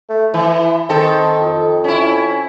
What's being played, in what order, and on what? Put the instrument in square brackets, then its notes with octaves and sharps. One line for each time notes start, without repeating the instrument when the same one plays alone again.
[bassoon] A3
[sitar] E3 [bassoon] E4
[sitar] D#3 A4 [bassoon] C4
[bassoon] F2
[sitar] C#4 E4